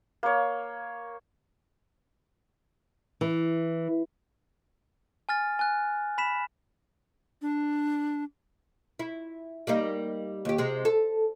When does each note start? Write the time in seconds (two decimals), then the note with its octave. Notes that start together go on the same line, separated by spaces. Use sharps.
0.23 A#3 C#5
3.21 E3
5.29 G#5 F6 A6
5.59 G#5 F#6
6.18 B5 B6 E7
7.42 D4
8.99 E4
9.67 G3 A#3 D#4
10.45 D#2 G4
10.58 C3 G#3
10.85 A4